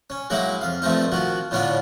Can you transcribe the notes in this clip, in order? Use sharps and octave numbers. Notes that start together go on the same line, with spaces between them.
C#4
F#3 G#3 A#3 D#4 E4
F2 F5
G2 F3 A3 C4 D#4
D#3 F3 F#4
A2 D3 B3 C#4 D4 F4